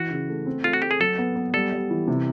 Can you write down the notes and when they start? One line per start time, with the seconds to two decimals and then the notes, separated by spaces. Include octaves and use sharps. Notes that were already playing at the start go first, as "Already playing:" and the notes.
Already playing: E3 F#4
0.10 C#3
0.29 A3
0.46 C4
0.64 A3 F4
0.73 F#4
0.82 A3 G4
0.91 G#4
1.00 F#3 A4
1.18 B3
1.36 B3
1.54 G3 A4
1.72 G3
1.90 E3
2.08 C3